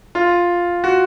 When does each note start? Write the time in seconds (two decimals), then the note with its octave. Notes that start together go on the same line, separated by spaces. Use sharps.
0.15 F4
0.84 F#4